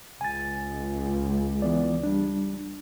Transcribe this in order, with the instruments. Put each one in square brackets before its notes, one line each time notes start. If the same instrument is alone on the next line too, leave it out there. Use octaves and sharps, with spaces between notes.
[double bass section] C#2 [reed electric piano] G#5 A6
[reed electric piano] E3 B3 D5
G3 D4